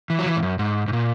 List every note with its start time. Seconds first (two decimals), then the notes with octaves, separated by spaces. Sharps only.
0.10 E3
0.19 F#3
0.26 E3
0.36 G#2
0.42 F#2
0.59 G#2
0.88 G#2
0.93 A#2